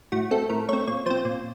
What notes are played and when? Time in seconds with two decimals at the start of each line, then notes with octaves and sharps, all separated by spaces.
0.12 A2 F#4
0.31 A3 C4 A4
0.49 A2 A#4
0.69 A3 C4 C#5
0.87 A#2 C#5
1.06 F3 C4 C5
1.25 A#2